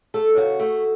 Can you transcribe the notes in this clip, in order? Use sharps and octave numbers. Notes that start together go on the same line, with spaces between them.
A3 A4
C#3 F#4
A3